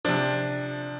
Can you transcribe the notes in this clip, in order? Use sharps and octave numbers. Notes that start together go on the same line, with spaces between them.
C3 F3 D4